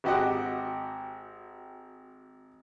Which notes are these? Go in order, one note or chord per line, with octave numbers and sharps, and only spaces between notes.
G#1 F#4 G4 D#5 F#5